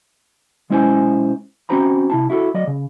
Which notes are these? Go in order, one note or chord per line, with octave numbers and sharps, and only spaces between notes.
B1 G#3 C#4 E4 C5 G#5
C4 C#4 F#4 C5 A#5 B5
C3 E4 A5
E4 F#4 G#4 A4
F#3 D5 D#5
C#3